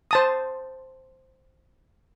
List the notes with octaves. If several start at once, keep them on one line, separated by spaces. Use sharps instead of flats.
C5 A5 D#6